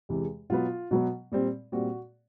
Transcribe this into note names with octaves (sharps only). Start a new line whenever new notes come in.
E2 C3 E3 G#3
B2 F#3 B3 F4
B2 F#3 B3
A#2 G3 C4
A#2 G3 C4 F#4